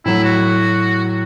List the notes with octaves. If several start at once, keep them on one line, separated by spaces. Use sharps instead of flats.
A2 F#3 E4
F#4